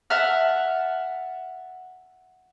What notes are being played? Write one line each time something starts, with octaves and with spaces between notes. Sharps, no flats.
E5 F#5 A5 F6